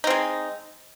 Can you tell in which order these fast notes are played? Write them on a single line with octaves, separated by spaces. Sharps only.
D#4 C4 G#3